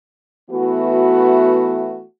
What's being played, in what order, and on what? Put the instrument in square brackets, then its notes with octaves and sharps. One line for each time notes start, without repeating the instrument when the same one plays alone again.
[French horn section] E3 A3 B3 F#4